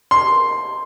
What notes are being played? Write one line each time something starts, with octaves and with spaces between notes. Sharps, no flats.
C6